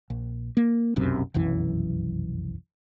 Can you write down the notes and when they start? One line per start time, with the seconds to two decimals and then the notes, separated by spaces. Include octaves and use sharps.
0.10 A#1
0.57 A#3
0.96 F1 B1 F#2 C3
1.34 F1 B1 F#2 E3